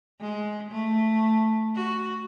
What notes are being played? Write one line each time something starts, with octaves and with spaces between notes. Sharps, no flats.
G#3
A3
F#4